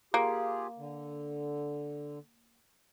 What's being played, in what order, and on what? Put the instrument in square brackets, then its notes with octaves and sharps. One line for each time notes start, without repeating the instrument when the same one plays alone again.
[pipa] A#3 [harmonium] F4 G4 G#4
[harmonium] D3